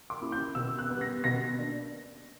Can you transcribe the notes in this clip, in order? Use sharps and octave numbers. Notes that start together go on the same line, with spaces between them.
D6
A#3 C#4 E4
G6
B2 E6
F#6
G3 B3
A#6
B2 A#6
A#3 D4